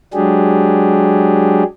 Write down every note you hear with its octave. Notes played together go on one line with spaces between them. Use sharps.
F#3 G#3 D4 G4 G#4